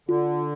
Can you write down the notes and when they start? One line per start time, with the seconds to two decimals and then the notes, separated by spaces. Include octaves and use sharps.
0.09 D3 F4